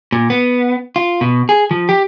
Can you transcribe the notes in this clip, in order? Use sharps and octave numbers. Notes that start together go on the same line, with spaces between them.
A#2
B3
F4
B2
G#4
F3
G4